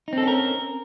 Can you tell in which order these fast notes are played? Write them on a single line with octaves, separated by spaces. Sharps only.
D#4 C4 A4 C#4 A#4